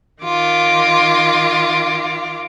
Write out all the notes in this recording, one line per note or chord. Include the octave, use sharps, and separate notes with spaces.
D#3 F4 D6